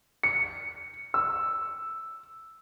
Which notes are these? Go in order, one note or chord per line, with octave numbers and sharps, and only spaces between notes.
C#7
E6